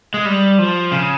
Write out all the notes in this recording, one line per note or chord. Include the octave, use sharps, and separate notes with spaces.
G#3
G3
F3
C#3